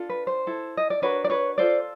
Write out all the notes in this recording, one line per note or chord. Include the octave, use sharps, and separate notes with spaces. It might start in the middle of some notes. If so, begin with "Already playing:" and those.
Already playing: D4 F4 A4
B4
C5
E4 A4
D#5
D5
D4 F#4 A#4 B4 C#5
D5
B4 C#5
F4 A4 C5 D5